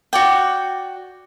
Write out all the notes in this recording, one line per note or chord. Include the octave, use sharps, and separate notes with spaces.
F#4 D5 G5